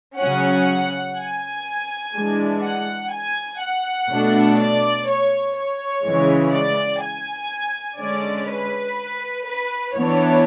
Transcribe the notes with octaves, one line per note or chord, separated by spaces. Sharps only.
C#3 F#3 C#4 F#5
G#5
E3 G#3 D4
F#5
G#5
F#5
B2 A3 D4
D5
C#5
C#5
C#3 E3 G#3
D5
G#5
D3 G#3 C#4 D5
B4
B4
E3 B3 D4 C#5